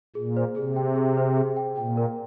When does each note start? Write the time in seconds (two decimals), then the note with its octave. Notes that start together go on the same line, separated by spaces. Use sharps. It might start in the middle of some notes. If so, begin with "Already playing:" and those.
0.15 A#2 G#4
0.37 C5
0.56 C3 G#4
0.76 G5
0.96 G#4
1.17 C5
1.37 G#4
1.57 G5
1.77 A#2 G5
1.97 A#4